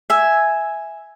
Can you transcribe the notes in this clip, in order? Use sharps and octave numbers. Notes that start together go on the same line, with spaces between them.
E5 G#5